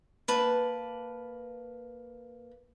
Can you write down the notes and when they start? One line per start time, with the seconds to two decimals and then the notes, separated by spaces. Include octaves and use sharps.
0.28 A#3 B4 A5